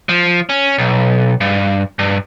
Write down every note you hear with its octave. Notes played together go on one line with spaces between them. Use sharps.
F3
C#4
B1
G2
G2